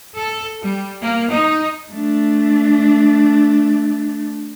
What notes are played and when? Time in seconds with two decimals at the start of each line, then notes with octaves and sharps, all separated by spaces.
0.16 A4
0.64 G3
1.02 A#3
1.31 D#4
1.92 A3 D4